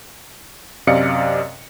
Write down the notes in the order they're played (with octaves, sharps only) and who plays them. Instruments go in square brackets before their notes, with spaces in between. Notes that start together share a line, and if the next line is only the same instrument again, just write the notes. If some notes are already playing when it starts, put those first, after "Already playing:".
[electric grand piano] F#2 C3 D5 D#5 F5 C#7